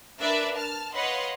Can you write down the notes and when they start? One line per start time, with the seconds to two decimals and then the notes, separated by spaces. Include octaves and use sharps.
0.20 D4 A#4 B4 D5 E5
0.54 A5 F6
0.94 B4 C#5 D#5 F5 F#5 C6